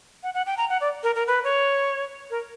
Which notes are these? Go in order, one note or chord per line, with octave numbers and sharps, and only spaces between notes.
F#5
F#5
G5
A#5
F#5
D5
A#4
A#4
B4
C#5
A#4